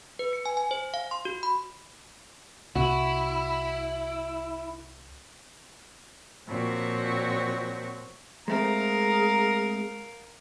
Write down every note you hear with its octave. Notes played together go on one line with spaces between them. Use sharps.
B4
C#7
G#5
G#5
C5
F5
C6
F#4
B5
C2 E4 F#4
A#2 F3 C4 F#4 C#5
G#3 A3 C4 G#4 A#4 F5 A#5